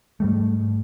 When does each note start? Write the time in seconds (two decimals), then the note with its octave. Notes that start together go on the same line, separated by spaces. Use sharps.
0.20 G#2 G3 A3